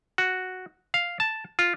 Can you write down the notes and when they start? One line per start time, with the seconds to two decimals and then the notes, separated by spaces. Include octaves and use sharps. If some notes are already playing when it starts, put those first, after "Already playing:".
0.18 F#4
0.94 F5
1.20 A5
1.59 F4